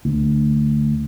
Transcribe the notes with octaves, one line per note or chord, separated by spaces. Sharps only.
D2